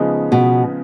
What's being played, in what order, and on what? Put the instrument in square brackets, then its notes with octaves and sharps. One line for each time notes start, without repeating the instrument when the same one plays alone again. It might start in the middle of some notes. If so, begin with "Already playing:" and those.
Already playing: [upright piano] C#3 F3 G#3 B3 D#4
[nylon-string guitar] B2